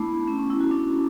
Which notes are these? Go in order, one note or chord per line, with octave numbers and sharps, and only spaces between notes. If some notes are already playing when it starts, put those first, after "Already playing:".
Already playing: A3 B3 D4 E4
C#4
C#4
E4
F#4
D4